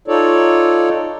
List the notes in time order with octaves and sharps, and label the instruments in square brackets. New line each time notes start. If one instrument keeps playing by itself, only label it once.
[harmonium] D#4 F4 A4 C#5 D5